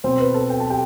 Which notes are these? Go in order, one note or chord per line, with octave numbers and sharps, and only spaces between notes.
B2 C4 C5
B4
A4 A5
G5
A5
G4 G5